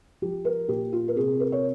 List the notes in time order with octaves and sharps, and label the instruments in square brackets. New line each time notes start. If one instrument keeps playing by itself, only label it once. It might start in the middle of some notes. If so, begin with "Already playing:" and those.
[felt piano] F3 G4
A#4
A#2 G4
F4
A#4
C3 G#4
A#4
C#5